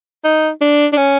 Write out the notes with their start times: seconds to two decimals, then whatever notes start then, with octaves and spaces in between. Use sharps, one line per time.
0.24 D#4
0.61 D4
0.92 D4
0.97 C#4